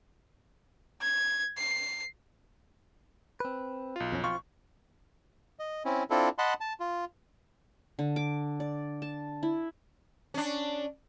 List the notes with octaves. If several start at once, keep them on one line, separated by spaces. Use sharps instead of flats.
G#6
C7
C4 B4
B1 F4
F2 C#4
F3 C4 F4 C#6
D#5
C4 C#4 E4
C4 D4 E4 F4 A4
D#5 F#5 A5 B5 C6
A5
F4
D3
D6
D5
A5
E4
C#4 D4